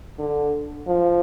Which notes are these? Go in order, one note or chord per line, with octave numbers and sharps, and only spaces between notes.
D3
F3